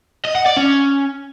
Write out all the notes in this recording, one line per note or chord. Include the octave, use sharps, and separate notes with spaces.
D#5
F#5
D5
C#4